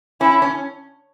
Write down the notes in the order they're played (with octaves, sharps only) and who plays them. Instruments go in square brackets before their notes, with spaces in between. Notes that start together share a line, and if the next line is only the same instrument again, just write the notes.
[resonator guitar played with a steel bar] C#4 [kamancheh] E4
[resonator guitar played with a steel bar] C#4